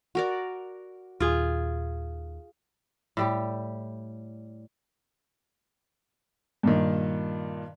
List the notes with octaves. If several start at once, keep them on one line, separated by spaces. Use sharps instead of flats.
F#4 A#4 D5
D#2 A#2 F4 G#4
A2 G3 G4
G2 A#2 D#3